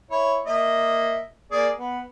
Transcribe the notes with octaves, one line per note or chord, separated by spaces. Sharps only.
E4 C#5
A#3 D#5 E5
A#3 G#4 D5
B3